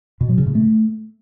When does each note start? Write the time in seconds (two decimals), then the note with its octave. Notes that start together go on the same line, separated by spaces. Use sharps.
0.21 B2
0.29 F#3
0.38 C#3
0.46 A2
0.55 A3